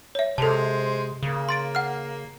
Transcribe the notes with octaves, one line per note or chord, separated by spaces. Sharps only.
C#5 E5
C3 G#3 A4 C5 A5
C#3 A#3
C6 A6 D7
F#5 F6